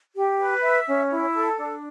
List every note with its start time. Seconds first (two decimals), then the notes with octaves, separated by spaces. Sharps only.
0.15 G4
0.39 B4
0.62 E5
0.87 C#4
1.10 E4
1.34 A4
1.58 D4